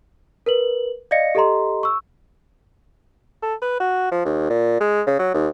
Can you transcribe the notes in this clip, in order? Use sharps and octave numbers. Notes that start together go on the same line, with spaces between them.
A#4 B4 F#7
D5 D#5 F5 A#6 C#7
G4 A4 D#5 A#5 C6
C#6 E6
A4
B4
F#4
F3
D#2
A#2
G#3
C#3
F#3
D#2